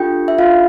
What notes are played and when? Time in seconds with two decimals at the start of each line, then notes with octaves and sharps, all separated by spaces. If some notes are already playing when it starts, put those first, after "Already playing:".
Already playing: D4 F4 G4 A4 G5
0.28 E5
0.38 F4 F5